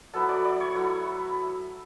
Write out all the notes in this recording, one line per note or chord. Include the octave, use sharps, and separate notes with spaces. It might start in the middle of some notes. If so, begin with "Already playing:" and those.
F#3 B3 E4 A4 A5
D5 D6
D5 D6
C#5 C#6
F#3 A3 E4